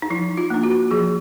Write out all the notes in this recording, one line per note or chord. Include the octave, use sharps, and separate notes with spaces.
D#4
F3 E4
F4
A#3 D4
F#4
F3 G#4